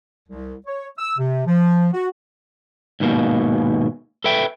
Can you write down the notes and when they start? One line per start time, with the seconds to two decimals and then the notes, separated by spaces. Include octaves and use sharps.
0.29 C2
0.66 C#5
0.98 E6
1.18 C3
1.47 F3
1.93 F#4
3.00 D#2 G#2 B2 A#3
4.24 A4 B4 E5 G5